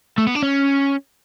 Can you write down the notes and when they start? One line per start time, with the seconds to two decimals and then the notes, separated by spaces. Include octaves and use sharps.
0.18 A3
0.27 B3
0.35 D4
0.42 C#4